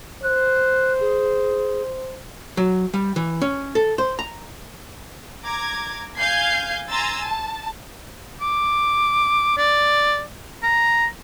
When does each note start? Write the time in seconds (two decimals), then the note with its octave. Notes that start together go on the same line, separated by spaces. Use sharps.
0.23 C5 F#6
1.00 G#4
2.57 F#3
2.94 G3
3.16 E3
3.42 C#4
3.75 A4
3.98 C5
4.19 A#5
5.43 A#5 D6 G#6
6.17 F5 G#5 G6 G#6 C7
6.88 G#5 A#5 C6 E6 A6
7.25 A5
8.41 D6
9.58 D5
10.63 A#5